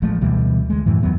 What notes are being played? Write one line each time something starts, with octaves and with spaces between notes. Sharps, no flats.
A1 F3 G#3 A3
D2 B2 E3 G3
D2 G#3
F#2 A2 E3
D#2 F#3 B3